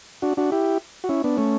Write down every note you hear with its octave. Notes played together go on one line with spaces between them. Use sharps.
D4 F#4
D4 F#4
E4 G4
F#4
C#4 E4
B3 D4
A3 C#4